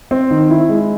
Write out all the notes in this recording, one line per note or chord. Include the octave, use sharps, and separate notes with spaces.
C4
D#3
E4
G#3